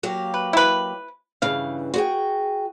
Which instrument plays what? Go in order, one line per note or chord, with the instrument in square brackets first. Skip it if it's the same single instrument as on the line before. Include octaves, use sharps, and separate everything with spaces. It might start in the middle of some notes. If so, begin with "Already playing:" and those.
[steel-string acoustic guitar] F#3 A#3 G4
[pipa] B4
E4 B4
[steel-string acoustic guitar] G2 C#3 E3 [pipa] F5
[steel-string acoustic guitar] F#4 G#4 G5